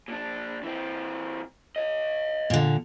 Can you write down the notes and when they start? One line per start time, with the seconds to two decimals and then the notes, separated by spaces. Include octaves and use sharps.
0.08 A#2 D4
0.63 E3 C4
1.76 C#5 D#5
2.50 A#2 D3